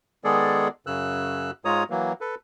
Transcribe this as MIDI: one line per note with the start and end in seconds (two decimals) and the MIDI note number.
0.24 0.68 51
0.24 0.68 56
0.24 0.68 59
0.24 0.68 68
0.24 0.68 69
0.24 0.68 74
0.87 1.51 42
0.87 1.51 49
0.87 1.51 88
0.87 1.51 90
1.65 1.84 44
1.65 1.84 56
1.65 1.84 65
1.65 1.84 73
1.65 1.84 82
1.65 1.84 87
1.90 2.13 52
1.90 2.13 54
1.90 2.13 58
2.21 2.35 69
2.21 2.35 71